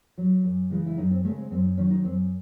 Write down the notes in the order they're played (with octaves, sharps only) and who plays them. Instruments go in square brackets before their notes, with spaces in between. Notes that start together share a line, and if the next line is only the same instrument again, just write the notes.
[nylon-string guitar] F#3
F#2
C#3 E3 G#3
E4
F#2 D#4
C4
C#3 E3 G#3 A3
C4
F#2 C4
D#4
D#3 F#3 C#4
D#4
F#2 C4